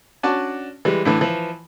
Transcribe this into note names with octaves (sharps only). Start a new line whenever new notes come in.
C#4 D4 F#4 D5 A5
E3 G3 G#3
A2 D3 E3
E3 F3